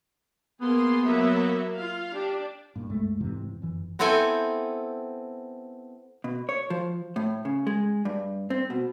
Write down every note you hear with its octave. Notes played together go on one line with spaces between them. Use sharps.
A#3 B3 G#4 C6
F#3 A#3 E5
F4 F5
D4 G4
G2 A#2
C2 F#2 G#3 A3
F2 G#2 C3 E3
G1 F#2 E3
B3 C4 E4 A4 G5 G#5
B2
C#5
F3
A2
C#3
G#3
G2
C4
B2